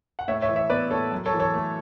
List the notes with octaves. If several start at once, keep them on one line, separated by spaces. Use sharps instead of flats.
F#5
A2 C#5 E5
C#5 E5
E3
C#5 E5
B3 B4 D5
A2 A4 C#5
F#2
A4 C#5
E3
A4 C#5
A3